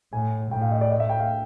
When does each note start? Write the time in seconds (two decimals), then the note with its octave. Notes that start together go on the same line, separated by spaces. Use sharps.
0.13 A2 G#5
0.51 A2 G5
0.62 F5
0.72 D#5
0.81 D5
0.90 D#5
1.00 E5
1.09 G5
1.20 F5